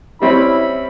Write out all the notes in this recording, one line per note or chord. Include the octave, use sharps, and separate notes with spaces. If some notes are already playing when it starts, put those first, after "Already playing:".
G3 C4 C#4 E4 B5